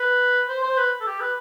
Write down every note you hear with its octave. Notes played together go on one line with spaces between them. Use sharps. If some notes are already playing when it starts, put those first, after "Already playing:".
Already playing: B4
C5
C5
B4
A4
G4
B4